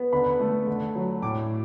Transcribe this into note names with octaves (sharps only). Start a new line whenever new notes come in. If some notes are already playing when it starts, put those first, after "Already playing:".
Already playing: B3
D3 B5
A3
D3
F#3
A2 D6